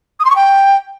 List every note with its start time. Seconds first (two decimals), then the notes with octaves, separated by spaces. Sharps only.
0.20 D#6
0.25 C6
0.30 C#6
0.35 G5